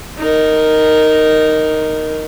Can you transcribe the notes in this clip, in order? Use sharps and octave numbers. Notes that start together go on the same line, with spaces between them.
D#4 A#4